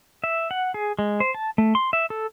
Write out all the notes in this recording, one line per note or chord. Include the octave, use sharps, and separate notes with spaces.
E5
F#5
G#4
G#3
C5
A5
A3
C6
E5
A4